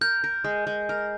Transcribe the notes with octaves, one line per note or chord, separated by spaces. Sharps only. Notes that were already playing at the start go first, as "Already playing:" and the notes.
A#4 G6
A#4
G#3
G#3
A#4